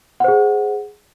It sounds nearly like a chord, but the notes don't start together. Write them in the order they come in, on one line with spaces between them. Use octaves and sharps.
F#5 C5 G#4